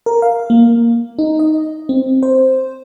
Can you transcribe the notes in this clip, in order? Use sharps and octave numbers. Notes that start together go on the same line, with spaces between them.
A#4
F5
A#3
D#4
D#5
C4
C5